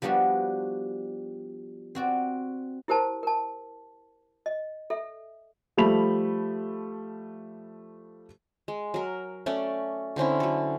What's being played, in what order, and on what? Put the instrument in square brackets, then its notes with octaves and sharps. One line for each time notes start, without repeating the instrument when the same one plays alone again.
[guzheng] F3 G3 B3 D4 F#4
C4 F#4 D5
[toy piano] E4 G4 A#4 C5 A5
A#4 A5
D#5
A4 E5
[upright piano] F3 G3 A3 B5 F7
[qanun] G#3
F#3 A#4
A3 C#4 A4 D5
D3 C4 C#4 E4
F#3 A4